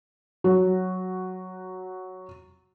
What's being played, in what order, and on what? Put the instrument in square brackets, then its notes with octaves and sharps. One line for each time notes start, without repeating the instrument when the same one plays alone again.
[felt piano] F#3 F#4